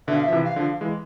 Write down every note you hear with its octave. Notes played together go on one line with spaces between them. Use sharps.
B2 D3 E5
F5
F3 E5
C3 E3
F5
D3 F3
E3 G#3